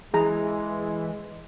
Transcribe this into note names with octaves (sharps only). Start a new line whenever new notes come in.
E3 G#3 G#4 A#5